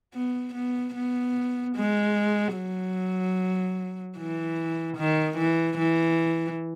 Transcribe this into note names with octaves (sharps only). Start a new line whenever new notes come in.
B3
B3
B3
G#3
F#3
E3
D#3
E3
E3